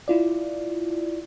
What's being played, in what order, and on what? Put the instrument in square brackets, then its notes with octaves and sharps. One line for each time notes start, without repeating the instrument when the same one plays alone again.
[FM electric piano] E4 F4 D5